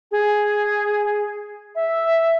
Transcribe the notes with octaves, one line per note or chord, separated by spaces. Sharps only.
G#4
E5